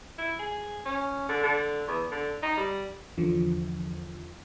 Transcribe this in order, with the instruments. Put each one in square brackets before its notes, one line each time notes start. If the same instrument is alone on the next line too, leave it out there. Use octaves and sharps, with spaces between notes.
[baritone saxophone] E4
G#4
C#4
D3
D3
E2
D3
D#4
G3
[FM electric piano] E2 D3 F3